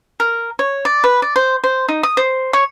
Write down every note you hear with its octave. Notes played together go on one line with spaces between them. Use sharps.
A#4
C#5
D5
B4
D5
C5
C5
D#4
D#6
C5
C#5